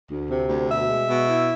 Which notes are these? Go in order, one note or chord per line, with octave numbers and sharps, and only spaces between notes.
D2
C3
D2
B2 E5
G#3
B2
E4